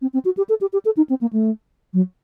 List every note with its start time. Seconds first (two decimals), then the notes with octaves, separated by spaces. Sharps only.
0.02 C4
0.13 C4
0.25 F#4
0.37 G4
0.49 A4
0.61 G4
0.73 G4
0.85 A4
0.97 D#4
1.09 C4
1.21 A#3
1.33 A3
1.93 F#3